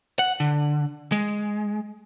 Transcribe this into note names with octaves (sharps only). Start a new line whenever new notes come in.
F#5
D3
G#3